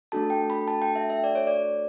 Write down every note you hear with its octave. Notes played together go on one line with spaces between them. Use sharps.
A3 D4 F#4 A4 A5
G5
B5
A5
G5
E5
E5
D5
C#5
D5